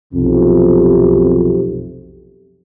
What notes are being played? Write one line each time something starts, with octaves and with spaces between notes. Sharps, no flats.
B1 F2 C3